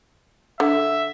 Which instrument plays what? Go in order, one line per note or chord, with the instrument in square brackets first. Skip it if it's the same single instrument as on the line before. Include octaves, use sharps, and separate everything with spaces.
[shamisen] D3 [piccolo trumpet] E5